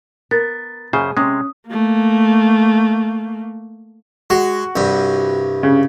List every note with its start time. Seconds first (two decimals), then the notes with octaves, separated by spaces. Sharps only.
0.31 B3 A#4 A6
0.93 F#2 C#3 G#4 C5
1.17 C3 G#3 C#4 D#6
1.69 A3 A#3
4.30 G#3 F#4
4.76 C2 G2
5.63 C#3